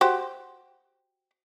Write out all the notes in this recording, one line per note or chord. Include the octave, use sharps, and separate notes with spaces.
F#4 G4 C5